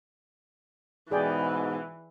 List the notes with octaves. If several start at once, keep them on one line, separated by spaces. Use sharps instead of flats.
G#2 B2 E3 G#4 D5 G5